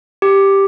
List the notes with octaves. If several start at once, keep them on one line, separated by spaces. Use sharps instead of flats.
G4